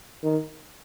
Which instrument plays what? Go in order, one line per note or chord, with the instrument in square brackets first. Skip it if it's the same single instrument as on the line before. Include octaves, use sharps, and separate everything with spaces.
[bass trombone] D#3